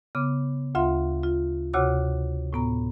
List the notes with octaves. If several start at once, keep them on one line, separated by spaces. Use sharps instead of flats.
C#3 B3 D6
D2 F4 E5 F5 C6
F4
D2 C3 F#4 C#5 D6
A2 B3 A#5